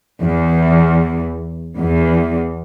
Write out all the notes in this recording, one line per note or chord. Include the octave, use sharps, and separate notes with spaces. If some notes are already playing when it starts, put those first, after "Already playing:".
E2
E2